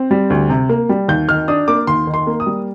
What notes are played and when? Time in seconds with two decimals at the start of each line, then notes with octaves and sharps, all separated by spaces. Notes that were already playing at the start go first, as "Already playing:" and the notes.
Already playing: C4
0.11 G3
0.30 D2
0.50 C3
0.69 A#3
0.89 G3
1.08 D#2 G6
1.28 D#3 F6
1.48 D4 D#6
1.68 A#3 D6
1.87 D#2 C6
2.07 D#3
2.14 C6
2.27 A#3
2.40 D#6
2.46 G3